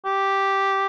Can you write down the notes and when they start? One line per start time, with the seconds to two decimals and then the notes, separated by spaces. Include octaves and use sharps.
0.06 G4